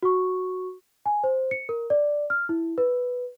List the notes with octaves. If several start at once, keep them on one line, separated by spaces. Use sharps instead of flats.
F#4 C#6
G#5
C5
C#7
A#4
D5
F6
E4
B4